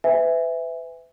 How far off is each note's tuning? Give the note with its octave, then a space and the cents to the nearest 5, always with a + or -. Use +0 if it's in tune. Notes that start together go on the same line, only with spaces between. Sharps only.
B4 +35 E5 +0 G#5 -20